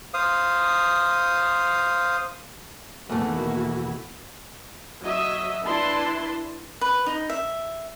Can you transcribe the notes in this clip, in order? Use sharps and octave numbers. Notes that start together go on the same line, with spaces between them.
C5 F5 D#6
E2 B2 D#3 A3 A#3 E4 F#4
F#3 D#5 E5
D4 E4 B4 A5 C6
B4
D#4
E5